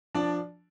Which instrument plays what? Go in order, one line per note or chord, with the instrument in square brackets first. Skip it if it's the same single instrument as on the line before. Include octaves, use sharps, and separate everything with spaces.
[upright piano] F3 D4 D5